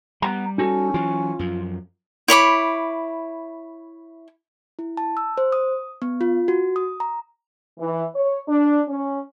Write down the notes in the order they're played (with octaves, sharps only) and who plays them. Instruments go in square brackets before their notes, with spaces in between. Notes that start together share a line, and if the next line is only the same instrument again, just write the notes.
[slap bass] G3 [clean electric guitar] B3 F#5 A#5
[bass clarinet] C#4 [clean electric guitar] D#4 F#4 A4
[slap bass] E3 F#3 [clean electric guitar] F4
[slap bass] F#2 F3
[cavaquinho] E4 C#5 B5 D6
[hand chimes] E4
A5
E6
C5
D#6
B3
F4
F#4
D#6
A#5
[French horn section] E3
C#5
D4
C#4